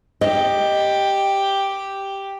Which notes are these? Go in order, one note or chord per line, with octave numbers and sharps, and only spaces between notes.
G4 D#5